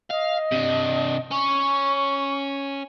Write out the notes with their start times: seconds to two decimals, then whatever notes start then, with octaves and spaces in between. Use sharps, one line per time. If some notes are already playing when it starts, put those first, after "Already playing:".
0.11 D#5 F5
0.52 C3 D4
1.32 C#4 C#6